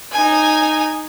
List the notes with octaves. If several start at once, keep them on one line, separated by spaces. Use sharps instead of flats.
D#4 G#5